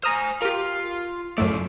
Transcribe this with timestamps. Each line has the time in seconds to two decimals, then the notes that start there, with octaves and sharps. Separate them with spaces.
0.03 C5 G#5 A#5 D#6 F6
0.42 F4 G4 A#4
1.38 F#2 A2 C#3 A3 D5